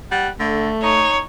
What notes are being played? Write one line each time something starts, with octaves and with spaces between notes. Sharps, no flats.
G3 F#5
D3 A3
D#4 C#5